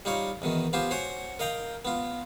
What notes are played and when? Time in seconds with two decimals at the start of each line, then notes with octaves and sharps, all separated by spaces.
0.05 G3 D#4 F4 C#5
0.42 E2 B2 D#3
0.73 B3 F4 G4 C5 G#5
0.91 F#4 C5 C#5 F#5 G#5
1.39 A#4 D#5 F5 G5 A#5
1.85 B3 F4